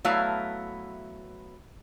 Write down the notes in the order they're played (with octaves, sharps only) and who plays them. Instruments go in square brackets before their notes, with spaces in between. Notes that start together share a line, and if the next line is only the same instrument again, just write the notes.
[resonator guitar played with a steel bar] F#3 A3 B3 E4 F5